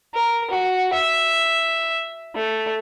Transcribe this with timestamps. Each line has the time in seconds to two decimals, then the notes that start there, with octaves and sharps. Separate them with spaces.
0.14 A#4
0.50 F#4
0.93 E5
2.35 A3